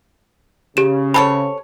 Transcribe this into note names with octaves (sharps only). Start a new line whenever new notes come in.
C#3 G4 E7
C4 A4 C#5 B5